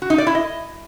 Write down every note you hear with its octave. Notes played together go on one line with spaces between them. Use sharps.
F#4
D#4
D5
E4
D#5